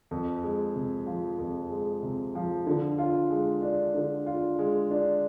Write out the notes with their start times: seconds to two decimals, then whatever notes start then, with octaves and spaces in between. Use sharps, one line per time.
0.11 F2
0.43 G#3
0.76 C3
1.07 F3
1.39 F2
1.71 G#3
2.03 C3
2.35 F3
2.67 D3
2.99 F4
3.30 G#3
3.62 D4
3.94 D3
4.26 F4
4.59 G#3
4.91 D4